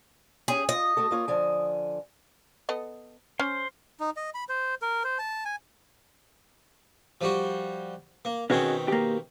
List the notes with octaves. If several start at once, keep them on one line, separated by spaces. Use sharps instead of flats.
C#4 G4 G#4
F4 D#5
A3 F#4 A4
A#3 F4 C#5
D3 F3 G#5
B3 A4 D#5
C#4 C5
D#4
D#5
B5
C5
A#4
C5
A5
G#5
F3 G3 F#4
A#3
B2 D#3 C4 C#4 F#4 G#4
A#3 G4